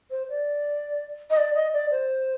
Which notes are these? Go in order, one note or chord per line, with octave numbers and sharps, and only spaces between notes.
C5
D5
D#5
D5
D#5
D5
C5